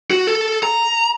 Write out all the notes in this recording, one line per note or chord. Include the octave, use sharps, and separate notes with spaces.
F#4
A4
A#5